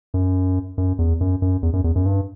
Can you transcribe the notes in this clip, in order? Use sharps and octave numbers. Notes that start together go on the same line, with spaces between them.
F#2
F#2
E2
F#2
F#2
E2
F#2
E2
F#2
G2